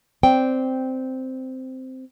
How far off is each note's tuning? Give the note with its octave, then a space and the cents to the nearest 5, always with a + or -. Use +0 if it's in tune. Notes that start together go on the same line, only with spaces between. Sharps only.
C4 -10 D5 -5 G5 +0